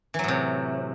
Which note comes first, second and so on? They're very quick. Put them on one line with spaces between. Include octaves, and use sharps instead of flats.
E3 F#3 A2 C3